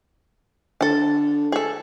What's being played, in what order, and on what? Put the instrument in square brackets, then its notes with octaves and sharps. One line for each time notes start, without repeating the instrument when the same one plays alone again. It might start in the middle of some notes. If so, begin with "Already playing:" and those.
[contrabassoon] D3 [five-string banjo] A4 A5
[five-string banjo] G#4 A4